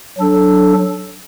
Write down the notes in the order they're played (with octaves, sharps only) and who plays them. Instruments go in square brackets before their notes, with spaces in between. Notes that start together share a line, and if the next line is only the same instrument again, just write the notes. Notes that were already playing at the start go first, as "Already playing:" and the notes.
[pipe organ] F#3 D4 A4